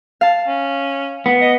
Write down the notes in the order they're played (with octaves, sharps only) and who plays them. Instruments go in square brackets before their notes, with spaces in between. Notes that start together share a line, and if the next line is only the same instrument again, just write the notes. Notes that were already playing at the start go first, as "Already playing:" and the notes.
[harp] F5 A5
[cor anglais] C#4
[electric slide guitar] B3
[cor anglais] D#5